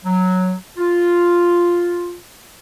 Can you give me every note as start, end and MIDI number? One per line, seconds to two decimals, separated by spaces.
0.05 0.54 54
0.78 2.17 65